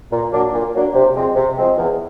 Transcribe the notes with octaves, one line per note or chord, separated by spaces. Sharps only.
A#2
F#3 A#3 D4
A#2
F#3 A#3 D4
C3
F3 G#3 C4
C3
F3 G#3 C4
E2